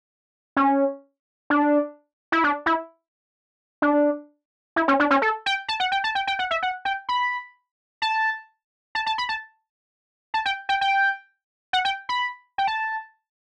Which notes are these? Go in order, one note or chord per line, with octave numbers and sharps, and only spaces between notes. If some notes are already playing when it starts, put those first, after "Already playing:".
C#4
D4
E4
D4
E4
D4
E4
C#4
D4
C#4
A4
G5
A5
F#5
G5
A5
G5
G5
F#5
E5
F#5
G5
B5
A5
A5
A5
B5
A5
A5
G5
G5
G5
F#5
G5
B5
G5
A5